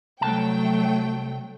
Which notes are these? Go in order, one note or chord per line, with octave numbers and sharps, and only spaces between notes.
C2 F#3 A3 G5 A5